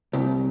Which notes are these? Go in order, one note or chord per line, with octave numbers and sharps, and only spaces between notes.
C2